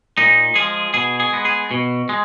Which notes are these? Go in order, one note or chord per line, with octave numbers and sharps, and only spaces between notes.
A#2 D#4
F3 G#3 G#4
B2 G#4
G#4
G#3 B3
G#4
B2
G#3